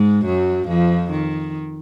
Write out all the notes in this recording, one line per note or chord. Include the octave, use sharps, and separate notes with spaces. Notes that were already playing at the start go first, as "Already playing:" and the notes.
Already playing: G#2 G#3
F#2 F#3
F2 F3
D#3